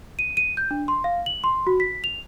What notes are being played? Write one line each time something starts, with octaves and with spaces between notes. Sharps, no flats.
D#7
D#7
G6
D4
C6
F5
F#7
C6
F#4
B6
F7